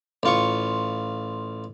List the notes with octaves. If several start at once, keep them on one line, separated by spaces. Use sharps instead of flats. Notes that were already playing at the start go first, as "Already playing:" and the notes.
A1 F4 C#6